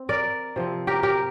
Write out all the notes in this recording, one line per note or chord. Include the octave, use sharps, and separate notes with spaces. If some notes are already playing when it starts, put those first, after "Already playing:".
Already playing: C4
A#4 D5
C3 F3 C4
G4 A#4
G4 A#4